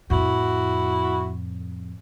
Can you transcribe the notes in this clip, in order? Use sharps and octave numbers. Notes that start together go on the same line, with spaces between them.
F2 A2 E4 F#4